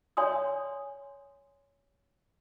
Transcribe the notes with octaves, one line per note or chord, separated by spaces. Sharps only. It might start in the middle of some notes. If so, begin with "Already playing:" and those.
C#5 D5 G#5 C6 D#6